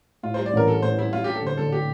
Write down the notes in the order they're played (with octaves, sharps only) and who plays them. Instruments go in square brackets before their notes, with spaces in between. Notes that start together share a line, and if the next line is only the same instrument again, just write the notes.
[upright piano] A2 [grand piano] F4
[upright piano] G3 [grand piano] C5
[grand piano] D5
[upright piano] A1 [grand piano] A#4
[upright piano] D4 [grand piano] A4
[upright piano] A2 [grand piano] C5
[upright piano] G3 [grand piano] E4
[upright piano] A3 [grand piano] F4
[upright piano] D4 [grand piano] G4
[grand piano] A4
[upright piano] D3 [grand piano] C5
[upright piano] D3 [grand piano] A4
[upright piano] A3 [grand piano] G4